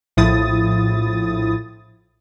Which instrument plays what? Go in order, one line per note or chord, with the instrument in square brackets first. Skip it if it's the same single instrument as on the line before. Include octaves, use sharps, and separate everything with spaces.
[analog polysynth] A#1 A2 F3 E4 D#6 A6